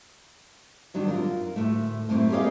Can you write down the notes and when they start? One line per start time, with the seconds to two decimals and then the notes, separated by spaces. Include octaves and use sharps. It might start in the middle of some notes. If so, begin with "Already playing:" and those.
0.94 D#3 F#3 G3 D4
1.08 F#2 F4 A#4
1.56 D2 A2 A3
2.09 F#2 A3 A#3 C4 E4
2.32 G4 G#4 A#4 C#5 D#5 F5